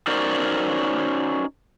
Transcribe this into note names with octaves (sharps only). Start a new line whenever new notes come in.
C#4 D#4 F#4 A#4 C5 D5